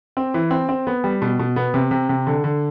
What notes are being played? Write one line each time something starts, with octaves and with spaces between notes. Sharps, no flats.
C4
E3
C4
C4
B3
G3
B2
B2
B3
C3
C3
C3
D3
D3